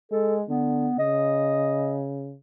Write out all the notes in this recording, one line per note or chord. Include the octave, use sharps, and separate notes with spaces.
G#3 A4
D3 B3
C#3 D#5